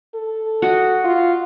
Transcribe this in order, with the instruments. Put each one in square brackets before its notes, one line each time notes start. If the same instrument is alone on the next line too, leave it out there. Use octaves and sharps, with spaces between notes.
[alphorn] A4
[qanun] F#4 D#5
[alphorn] F4